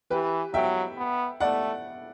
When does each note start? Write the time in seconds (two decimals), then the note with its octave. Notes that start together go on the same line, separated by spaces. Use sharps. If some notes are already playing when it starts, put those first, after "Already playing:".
0.11 E3 G4 B4
0.54 F#3 E5 G5
0.98 B3
1.40 A3 D5 F#5